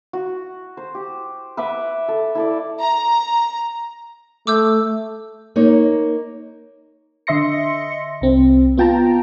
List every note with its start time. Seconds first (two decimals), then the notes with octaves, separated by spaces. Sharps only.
0.13 F#4
0.77 C5
0.95 G4
1.57 B4 E5 F#5 D6
2.08 A4
2.35 E4 A4 D5
2.80 A#5
4.47 A3 D6 E6 G6
5.56 A#3 D#4 C#5
7.27 D3 D#5 E5 C6 A#6 C#7
8.21 C2 C4
8.77 B3 F4 G5 A5 A#5